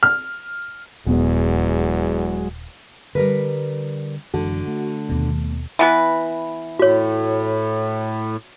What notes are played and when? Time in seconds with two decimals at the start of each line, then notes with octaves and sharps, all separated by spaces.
0.03 F6
1.07 D#1 E2 F#3 G#3 B3
3.15 D3 G3 A#4 B4
4.34 F#2 D3 E3 G#3 F#4
4.67 A3
5.09 D#2 B2
5.79 E3 B3 B4
6.79 A2 F#4 C#5